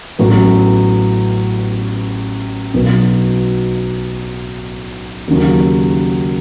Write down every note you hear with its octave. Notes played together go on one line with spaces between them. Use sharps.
A1 A2 F#3 B3
B1 B2 F#3 B3
D#2 C#3 F#3